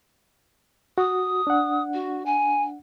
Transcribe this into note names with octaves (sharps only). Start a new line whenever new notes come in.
F#4 D#6
D4 F#5
F#4
G#5